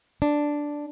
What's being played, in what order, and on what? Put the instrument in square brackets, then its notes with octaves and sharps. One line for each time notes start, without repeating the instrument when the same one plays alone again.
[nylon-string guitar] D4